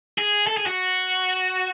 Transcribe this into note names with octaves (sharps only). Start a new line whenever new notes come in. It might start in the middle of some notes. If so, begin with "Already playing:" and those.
G#4
A4
G#4
F#4